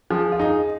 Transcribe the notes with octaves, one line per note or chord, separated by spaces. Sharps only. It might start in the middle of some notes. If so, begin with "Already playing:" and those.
F3 G#4
F4
D#4 G#4